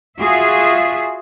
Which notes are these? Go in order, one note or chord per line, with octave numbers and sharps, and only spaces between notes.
F4 F#4 G#4 E5